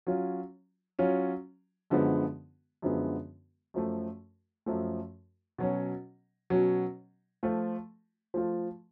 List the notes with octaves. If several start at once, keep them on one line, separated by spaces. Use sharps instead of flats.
F#3 C#4 F4
F#3 C#4 F4
F#2 D3 F3 G#3 B3
F#2 D3 F3 G#3 B3
F#2 F3 A3
F#2 F3 A3
B2 F#3 C#4
B2 F#3 C#4
F3 A3 F4
F3 A3 F4